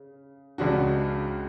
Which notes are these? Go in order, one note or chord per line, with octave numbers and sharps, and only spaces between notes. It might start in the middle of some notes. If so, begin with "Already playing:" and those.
Already playing: C#3
C#2 C#3 G#3 D4 F#4